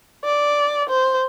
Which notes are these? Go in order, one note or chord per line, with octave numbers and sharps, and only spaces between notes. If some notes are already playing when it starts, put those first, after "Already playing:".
D5
C5